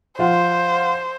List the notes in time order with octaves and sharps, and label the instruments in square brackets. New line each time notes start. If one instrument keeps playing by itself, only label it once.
[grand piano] F3 F4 F#5 [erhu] C5